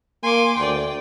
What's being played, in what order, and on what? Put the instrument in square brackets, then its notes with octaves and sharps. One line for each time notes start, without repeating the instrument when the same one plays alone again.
[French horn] A#3 [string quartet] G#5 C6 D6
[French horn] D2 [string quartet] D5 G5